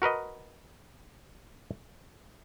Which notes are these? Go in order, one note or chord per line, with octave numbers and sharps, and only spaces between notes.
F#4 A#4 B4 D#5